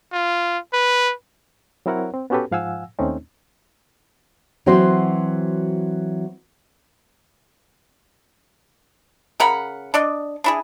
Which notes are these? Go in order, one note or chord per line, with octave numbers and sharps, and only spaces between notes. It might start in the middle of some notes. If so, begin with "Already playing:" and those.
F4
B4
F#3 C4 E4 A#4 C#5 F#5
C4
B3 C#4 F#4 G4 A4 B4
G#2 F3 F5 F#5 G#5 E6
D#2 A3 C4 C#4 D#4
E3 F#3 C4 F#4 C5
C#3 A#4 F#5 B5
D4 D5 D#5
D4 E4 G#4